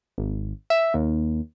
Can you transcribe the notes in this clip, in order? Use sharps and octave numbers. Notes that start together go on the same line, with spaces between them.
G#1
E5
D#2